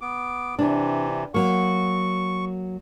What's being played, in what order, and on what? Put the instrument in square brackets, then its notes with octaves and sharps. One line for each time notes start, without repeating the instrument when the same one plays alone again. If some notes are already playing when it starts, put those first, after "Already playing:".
[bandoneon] B3 D6
[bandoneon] C3 E3 [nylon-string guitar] D4
[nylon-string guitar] F#3 A#3 [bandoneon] C#6